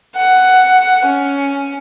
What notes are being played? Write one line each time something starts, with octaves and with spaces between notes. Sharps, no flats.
F#5
C#4